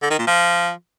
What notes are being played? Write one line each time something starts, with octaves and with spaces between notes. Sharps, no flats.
D3
D#3
A#2
F3